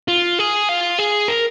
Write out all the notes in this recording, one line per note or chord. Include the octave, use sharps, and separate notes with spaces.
F4
G#4
F4
G#4
A#4